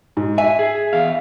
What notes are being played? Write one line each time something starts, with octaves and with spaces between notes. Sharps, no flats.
G#2
E5 G#5
G#4
E2 F5